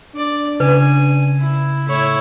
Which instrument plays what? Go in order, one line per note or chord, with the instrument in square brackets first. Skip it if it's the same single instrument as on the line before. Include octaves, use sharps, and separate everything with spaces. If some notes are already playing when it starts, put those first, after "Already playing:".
[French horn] D4 [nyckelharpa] D5
[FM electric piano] C#3 [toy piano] B4 [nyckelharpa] G#5
[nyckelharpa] E4
[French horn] A2 [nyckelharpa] E4 C#5